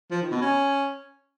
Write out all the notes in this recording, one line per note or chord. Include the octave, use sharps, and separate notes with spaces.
F3
D#3
B2
C#4